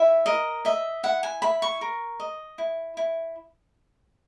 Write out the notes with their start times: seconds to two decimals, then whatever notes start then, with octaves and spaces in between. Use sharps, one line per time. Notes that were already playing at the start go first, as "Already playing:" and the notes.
Already playing: E4 E5
0.26 A#4 D#5
0.65 D#5 E5
1.03 E4 F#5
1.23 G#5
1.42 E4 B5
1.62 C#6
1.81 A#4
2.20 D#5
2.58 E4
2.97 E4